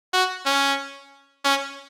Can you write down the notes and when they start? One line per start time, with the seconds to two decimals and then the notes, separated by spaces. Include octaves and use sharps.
0.13 F#4
0.46 C#4
1.44 C#4